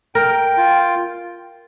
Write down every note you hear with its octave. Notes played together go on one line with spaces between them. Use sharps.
A#4 G5
F4